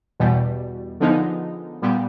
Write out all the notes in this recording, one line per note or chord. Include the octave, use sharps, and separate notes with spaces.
E2 B2 G3
D3 F3 G#3 B3 D#4
A#2 G3 B3